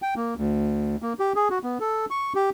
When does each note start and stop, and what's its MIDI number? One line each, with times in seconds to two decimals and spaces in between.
0.02 0.14 79
0.16 0.34 58
0.37 0.96 38
1.02 1.13 58
1.19 1.33 67
1.36 1.48 68
1.50 1.59 66
1.63 1.78 59
1.80 2.06 69
2.10 2.33 85
2.35 2.50 67